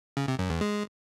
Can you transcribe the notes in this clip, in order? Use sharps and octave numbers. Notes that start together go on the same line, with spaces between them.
C#3
C3
F#2
E2
G#3